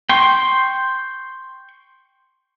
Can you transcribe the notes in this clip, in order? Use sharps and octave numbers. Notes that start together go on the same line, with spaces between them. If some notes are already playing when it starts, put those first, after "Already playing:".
G5 C6 C#6